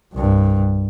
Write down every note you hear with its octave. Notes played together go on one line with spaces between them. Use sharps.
C2 G2